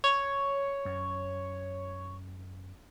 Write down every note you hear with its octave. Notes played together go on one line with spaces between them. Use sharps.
C#5
F#2